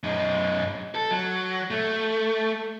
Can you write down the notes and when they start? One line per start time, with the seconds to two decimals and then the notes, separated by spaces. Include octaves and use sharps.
0.03 F#2 D#4
0.95 A4
1.11 F#3
1.70 A3